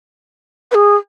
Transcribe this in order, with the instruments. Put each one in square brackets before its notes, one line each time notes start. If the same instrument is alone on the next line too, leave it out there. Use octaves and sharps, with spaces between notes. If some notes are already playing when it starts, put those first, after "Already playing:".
[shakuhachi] B4
G#4